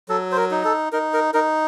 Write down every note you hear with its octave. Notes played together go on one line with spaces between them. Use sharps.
F#3 A4
C5
A#4
D#4
A4
D#4 A#4
A#4
D#4 A#4